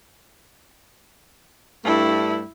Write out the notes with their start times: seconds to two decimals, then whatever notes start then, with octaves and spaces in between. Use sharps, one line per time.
1.84 G2 A3 E4